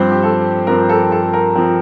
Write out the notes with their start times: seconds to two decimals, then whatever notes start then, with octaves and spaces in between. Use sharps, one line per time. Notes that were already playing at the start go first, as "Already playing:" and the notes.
Already playing: G2 F3 C4 C5
0.12 G4
0.23 A4
0.67 G2 F3 C4 A#4
0.89 A4
1.12 A4
1.33 A#4
1.55 F3 C4